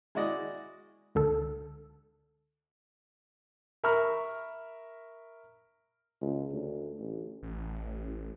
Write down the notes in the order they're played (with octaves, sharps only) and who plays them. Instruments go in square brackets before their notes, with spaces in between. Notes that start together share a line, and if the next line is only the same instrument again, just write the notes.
[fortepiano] G#3 E4 F#4 D5 D#5
[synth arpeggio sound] C#2 D3 A4
[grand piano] A#4 E5 A#5 B5 C#6 F6
[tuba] C#2
D2
A1
[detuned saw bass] A1